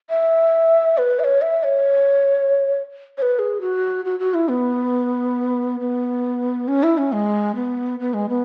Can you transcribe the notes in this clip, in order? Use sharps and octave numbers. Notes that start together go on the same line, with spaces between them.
E5
B4
E5
C#5
E5
C#5
C#5
B4
G#4
F#4
F#4
F#4
E4
B3
B3
C#4
E4
C#4
G#3
B3
B3
G#3
B3